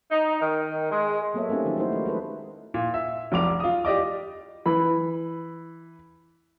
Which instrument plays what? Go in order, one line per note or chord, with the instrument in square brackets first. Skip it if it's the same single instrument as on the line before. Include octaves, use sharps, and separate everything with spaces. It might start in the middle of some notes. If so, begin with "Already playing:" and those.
[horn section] D#4
D#3
G#3
[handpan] F#3 A#3 B3 A4 C#5 E5
A3 C4 C#4 D#4 G4
D#3 F3 F#3 C#4 D#4
F#3 A3 D#4 E4 F#4 C5
G#3 A3
G#3 G#4 A4 B4
[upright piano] A#2
E5
F1 B1 D6 F7
F4 D#6
G4 D5 D#5 D6
[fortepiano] E3 B5